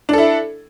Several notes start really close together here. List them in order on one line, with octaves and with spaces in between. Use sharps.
D4 A4 E4